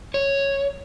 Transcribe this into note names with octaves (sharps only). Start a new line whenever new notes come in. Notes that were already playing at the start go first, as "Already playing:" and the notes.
C#5